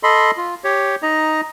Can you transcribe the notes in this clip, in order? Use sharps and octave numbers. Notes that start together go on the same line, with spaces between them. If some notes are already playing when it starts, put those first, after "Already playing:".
A4 D#5 B5 C6
F4
G4 C#5
D#4 D#5 A#5